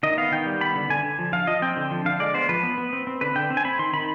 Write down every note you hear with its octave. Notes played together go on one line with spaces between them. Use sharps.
D#3 D#5
B3 F5
D#3 G5
G3
B3 B5
D3
D3 G#5
D3
F3
F3 F5
F3 D#5
C4 G5
D3
F3
D3 F5
G#3 D5
B3 C5
F3 B4
B3
B3
C4
C4
D3 B4
D3 G5
C4
G#5
C4 B5
D#3 C6
D#3 B5